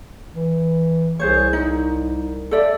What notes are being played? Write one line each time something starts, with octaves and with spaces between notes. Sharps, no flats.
E3
C2 G#4 C5 C#5
D#4
A4 D5 E5